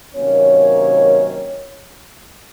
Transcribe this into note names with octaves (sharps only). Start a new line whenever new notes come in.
C3 D#3 F#3 A#3 C#4 C#5